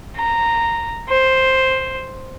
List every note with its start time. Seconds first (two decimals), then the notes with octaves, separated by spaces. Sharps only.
0.16 A#5
1.09 C5